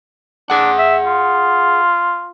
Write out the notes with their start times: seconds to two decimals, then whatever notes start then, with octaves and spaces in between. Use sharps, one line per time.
0.50 D4 G#4 F#5
0.78 E5
1.06 F4